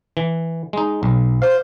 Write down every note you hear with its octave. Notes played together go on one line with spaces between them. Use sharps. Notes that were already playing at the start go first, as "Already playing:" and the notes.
E3
G#3 D#4
B1
C5 F5